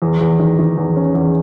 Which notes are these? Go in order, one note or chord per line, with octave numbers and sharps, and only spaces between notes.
E2
E2
D#3
D#3
E2
C#4
E2